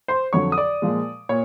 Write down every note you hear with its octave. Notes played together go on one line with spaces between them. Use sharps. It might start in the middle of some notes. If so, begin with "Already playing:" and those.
C5 C6
F2 D3 F#3 C#5 C#6
D#6
D5 D6
A#2 F3 G#3
A#2 C#5